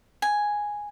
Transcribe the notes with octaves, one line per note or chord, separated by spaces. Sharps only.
G#5